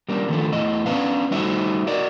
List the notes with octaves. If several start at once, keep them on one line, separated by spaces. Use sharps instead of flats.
G3 A#3 D4
D3 D#3 F3 A3
E2 A2 D#5
B3 C#4 D4 B4 F5
G3 A3 D#4 F#4 C5 E5
F#4 A#4 D5 D#5